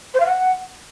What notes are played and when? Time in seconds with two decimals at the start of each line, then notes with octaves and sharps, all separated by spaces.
0.14 C5
0.20 F5
0.26 F#5